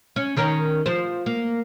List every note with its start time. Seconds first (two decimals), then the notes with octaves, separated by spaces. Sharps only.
0.16 C#4
0.36 D#3 C#4 A#4
0.86 F3 C5
1.26 A#3